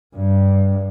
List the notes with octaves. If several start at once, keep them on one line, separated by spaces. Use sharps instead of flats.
G2